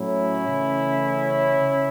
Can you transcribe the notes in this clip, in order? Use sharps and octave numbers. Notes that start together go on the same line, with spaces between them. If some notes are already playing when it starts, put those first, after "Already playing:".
Already playing: A2 F#3 A3 C#4 E4
C#3 E3 A3
C#3